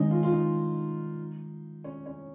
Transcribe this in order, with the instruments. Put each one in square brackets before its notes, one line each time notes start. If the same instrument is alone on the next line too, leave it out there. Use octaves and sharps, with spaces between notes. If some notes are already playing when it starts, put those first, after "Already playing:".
Already playing: [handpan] D#3 G#3 C#4 [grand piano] D#4
[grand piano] F4
F4
D#4
C#4
C#4